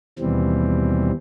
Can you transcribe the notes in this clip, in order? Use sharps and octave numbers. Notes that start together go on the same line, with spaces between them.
D#2 B2 E3 G3 C4